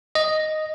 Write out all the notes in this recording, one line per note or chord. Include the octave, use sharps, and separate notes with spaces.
D#5